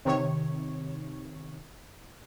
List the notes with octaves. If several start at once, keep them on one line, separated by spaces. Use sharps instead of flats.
C3 D#3 C#5